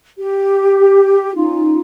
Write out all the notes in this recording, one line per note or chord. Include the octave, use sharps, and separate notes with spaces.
G4
C#4 D#4 F4